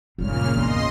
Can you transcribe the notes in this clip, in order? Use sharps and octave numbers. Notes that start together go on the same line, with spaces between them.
G2 A#2 C#3 G#3 F6
E2 D#4 D#5 C6